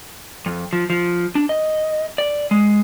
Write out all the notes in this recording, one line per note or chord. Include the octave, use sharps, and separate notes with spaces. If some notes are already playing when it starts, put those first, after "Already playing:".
F2
F3
F3
D4
D#5
D5
G#3